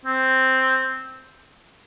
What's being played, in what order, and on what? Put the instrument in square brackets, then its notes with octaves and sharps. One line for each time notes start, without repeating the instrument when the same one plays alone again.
[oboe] C4